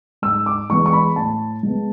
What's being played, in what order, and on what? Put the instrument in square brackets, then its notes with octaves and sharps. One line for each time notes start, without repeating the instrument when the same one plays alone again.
[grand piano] G#2 E6
D6
E3 G#3 B3 C#6
C#6
B5
A2 A5
G#3 B3